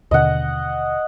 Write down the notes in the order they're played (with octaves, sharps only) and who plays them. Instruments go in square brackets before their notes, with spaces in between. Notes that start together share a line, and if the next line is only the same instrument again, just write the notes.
[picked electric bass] D#2 B2 D3 [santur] D#5 F#5